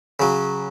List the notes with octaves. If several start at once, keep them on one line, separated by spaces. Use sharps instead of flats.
C#3 F#3